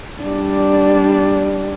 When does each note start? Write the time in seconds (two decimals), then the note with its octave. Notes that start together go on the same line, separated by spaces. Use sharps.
0.22 G3 D4